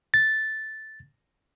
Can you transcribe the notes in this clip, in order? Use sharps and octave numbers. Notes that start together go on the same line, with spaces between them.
A6